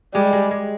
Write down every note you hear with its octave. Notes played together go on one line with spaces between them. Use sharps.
G3 G#3
G#3
G#3